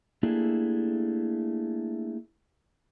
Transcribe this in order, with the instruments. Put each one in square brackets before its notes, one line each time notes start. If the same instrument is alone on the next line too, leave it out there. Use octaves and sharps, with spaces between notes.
[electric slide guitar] A3 A#3 D4 E4 G4 G#4